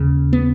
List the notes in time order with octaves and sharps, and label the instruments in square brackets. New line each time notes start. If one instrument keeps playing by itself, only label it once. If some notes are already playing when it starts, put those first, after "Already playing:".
Already playing: [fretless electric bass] D#2 C#3
B3